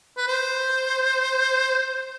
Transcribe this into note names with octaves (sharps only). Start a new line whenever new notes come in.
B4
C5